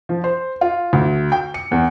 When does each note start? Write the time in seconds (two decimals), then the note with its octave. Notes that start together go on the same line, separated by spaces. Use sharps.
0.09 F3
0.24 C5
0.61 F4
0.93 D2
1.32 G5
1.54 C#7
1.71 E2